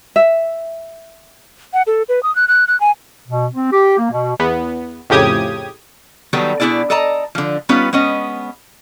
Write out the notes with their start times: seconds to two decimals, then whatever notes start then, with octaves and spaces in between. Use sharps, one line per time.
0.16 E5
1.74 F#5
1.87 A4
2.09 B4
2.23 D#6
2.36 F#6
2.48 F#6
2.68 F#6
2.80 G#5
3.28 B2
3.53 C4
3.72 G4
3.98 A#3
4.10 B2
4.40 E2 B3
5.10 F2 A2 C#3 G4 D#6 G#6
6.33 D#3 F#3 G3 B3 D#4 A4
6.60 B2 B3 D4 E4 G#4 D5
6.90 A4 D5 D#5 A5 A#5
7.35 D3 F3
7.69 G3 B3 C#4 D#4 F4 B4
7.93 G#3 B3 C#4 D#5